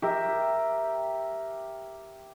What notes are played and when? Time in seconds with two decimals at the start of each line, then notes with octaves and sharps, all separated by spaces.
0.02 G4 A#4 E5